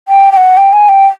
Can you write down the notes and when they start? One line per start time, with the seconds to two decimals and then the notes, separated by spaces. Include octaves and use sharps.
0.08 G5
0.32 G5
0.37 F#5
0.57 G5
0.73 G#5
0.89 G5